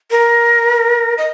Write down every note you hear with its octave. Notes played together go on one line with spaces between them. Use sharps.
A#4
D#5